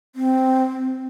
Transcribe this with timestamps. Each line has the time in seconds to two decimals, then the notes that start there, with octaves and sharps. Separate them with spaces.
0.16 C4